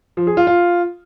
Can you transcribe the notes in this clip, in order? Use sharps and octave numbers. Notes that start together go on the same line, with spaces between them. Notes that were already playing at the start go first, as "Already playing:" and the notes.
F3
G#4
F4
F4